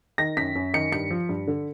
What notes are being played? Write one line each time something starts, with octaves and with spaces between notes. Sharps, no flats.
D#3 A#6
F#2 B6
F#2
D#3 C#7
G2 C#7
F3
G2
D3